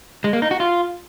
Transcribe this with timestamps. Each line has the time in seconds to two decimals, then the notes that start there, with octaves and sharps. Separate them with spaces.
0.24 G#3
0.33 A#3
0.42 D#4
0.51 F#4
0.60 F4